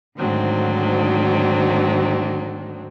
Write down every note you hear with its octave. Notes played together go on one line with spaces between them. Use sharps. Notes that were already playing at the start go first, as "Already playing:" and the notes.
D2 G#2 D#3 F#3 C4 D4